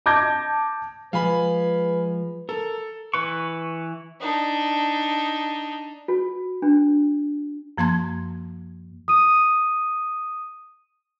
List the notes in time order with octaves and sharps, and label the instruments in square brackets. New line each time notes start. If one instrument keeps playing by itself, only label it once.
[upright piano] A5 D6 G6 G#6 A#6
[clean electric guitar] F3 G#3 [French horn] B4 [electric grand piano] F5 G#5 B5
[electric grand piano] A4 [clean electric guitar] A#4
[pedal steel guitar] E3 B4 C#6
[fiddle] D4 D#4
[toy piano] F#4
D4
[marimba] F#2 F3 A#3 A5 C6 G#6
[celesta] D#6 D#7